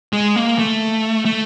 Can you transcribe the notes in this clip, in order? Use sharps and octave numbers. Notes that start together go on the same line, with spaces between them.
G#3
A#3
A3
A3